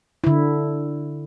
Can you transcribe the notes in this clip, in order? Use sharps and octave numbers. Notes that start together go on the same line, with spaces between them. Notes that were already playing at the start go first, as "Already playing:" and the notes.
D3 E4